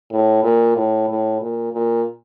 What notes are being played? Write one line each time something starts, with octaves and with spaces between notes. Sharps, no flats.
A2
A#2
A2
A2
A#2
A#2